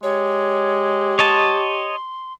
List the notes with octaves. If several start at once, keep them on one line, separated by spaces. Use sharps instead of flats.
G#3 G4 C#5
C#5 D#5 A5 C6